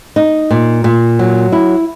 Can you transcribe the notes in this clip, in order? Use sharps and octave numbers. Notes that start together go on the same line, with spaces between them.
D#4
A#2
A#2
F#3
E4